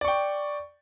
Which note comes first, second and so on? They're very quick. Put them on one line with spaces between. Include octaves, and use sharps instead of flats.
D5 C#6 G5